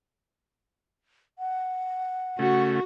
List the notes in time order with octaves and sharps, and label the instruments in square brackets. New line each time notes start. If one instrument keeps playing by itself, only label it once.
[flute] F#5
[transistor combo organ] C#3 A3 [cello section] F#4